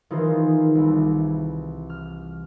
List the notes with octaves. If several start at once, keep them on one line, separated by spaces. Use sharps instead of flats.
D#3 E3 F4 G#4 A#4 C5
C2 E3
F6